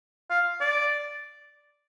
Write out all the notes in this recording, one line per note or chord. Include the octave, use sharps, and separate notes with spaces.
F5
D5